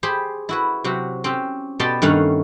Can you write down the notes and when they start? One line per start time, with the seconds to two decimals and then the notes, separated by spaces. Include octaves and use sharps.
0.03 G4 G#4 C5 B5
0.49 E4 F#4 B4
0.84 C3 F#3 F#4 G4
1.24 C4 C#4 G4
1.80 B2 B3 G4 D5 A5 C6
2.02 G2 D#3 A3 C#4 F5 F#5